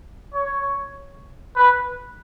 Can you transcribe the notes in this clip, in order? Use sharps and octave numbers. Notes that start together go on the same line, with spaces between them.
C#5
B4